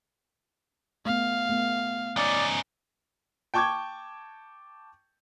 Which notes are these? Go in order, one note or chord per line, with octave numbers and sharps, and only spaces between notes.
A3 B3 F5
A3 B3
C#4 D#4 D5
G5 A5 C#6 D6 G6 G#6